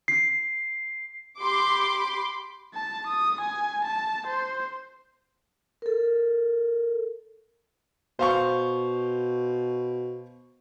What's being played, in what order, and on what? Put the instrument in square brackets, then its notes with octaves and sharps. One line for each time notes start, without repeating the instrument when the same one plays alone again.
[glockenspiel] C7
[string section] G4 B5 C6 D6
[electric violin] A5
D#6
G#5
A5
C5
[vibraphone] A4 A#4
[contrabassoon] B2 [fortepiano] C5 F5 C#6